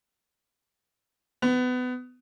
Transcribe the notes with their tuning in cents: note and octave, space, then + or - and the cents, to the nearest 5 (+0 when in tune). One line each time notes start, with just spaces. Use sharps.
B3 +25